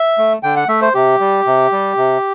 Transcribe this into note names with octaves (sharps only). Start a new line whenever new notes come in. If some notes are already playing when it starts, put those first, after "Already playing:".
Already playing: E5
A3
D3 G5
F#5
A3 E5
C5
C3 G4
G3
C3
G3
C3